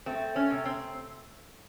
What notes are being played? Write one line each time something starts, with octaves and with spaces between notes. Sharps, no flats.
A3 C4
C#4
C3
C4